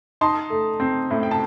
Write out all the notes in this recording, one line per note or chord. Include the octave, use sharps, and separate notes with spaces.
D#4 A5 C6
A3
C4
A2
G5
A5